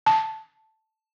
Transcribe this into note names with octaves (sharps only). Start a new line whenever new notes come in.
A5